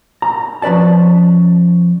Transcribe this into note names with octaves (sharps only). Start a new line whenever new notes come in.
A#5
F3 C#4 B4 D5 A5